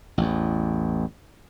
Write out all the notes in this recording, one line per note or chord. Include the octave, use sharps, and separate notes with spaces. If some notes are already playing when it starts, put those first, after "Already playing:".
A1 E2